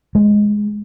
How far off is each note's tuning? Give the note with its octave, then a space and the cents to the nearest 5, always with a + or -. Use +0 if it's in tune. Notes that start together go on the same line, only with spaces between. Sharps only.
G#3 +0